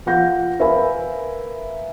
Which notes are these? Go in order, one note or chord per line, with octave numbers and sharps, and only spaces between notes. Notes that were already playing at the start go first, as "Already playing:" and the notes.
F3 F5 F#5 G6 A#6
A#4 B4 E5 F5 G#5 B5